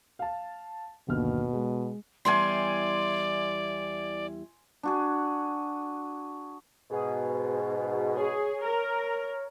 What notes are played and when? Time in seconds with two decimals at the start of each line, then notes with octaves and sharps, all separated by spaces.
0.19 F5 A5
1.08 G1 D#2 B2 F6
1.53 G#3
2.25 E2 G3 E4 D5 G#5 C6
4.83 D4 F#4 G#4
6.91 G#2 B2 G#4
8.17 G#4 C#5
8.64 A#4